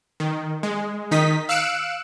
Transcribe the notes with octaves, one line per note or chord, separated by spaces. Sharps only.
D#3
G#3
D#3 D#4 D#5 B6
F5 E6 F#6 C#7 D7 E7